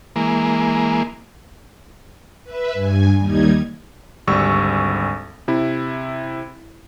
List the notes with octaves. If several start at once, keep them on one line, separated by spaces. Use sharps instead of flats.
E3 G#3 A#3
B4 E5
G2 G#5
D#2 G3 D#4 G#6
G#1 D2 G3 C#6 E6
C3 E4